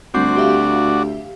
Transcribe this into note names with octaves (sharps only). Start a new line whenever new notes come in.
D2 G3 C4 F#4 D5 C6
G4 E5 F5